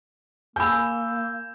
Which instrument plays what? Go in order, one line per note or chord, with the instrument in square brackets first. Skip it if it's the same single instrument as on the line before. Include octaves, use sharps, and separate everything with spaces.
[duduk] A#3 [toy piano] G#5 B5 [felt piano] E6 G6